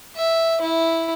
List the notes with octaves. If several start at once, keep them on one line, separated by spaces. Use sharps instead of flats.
E5
E4